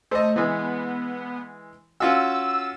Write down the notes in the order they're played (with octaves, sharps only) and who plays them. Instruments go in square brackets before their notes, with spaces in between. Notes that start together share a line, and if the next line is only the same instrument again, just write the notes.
[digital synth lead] A3 [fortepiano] C5 D#5
[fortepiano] E3 G#3 [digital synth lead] B3
[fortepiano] C#4 F4 F#4 [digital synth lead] E6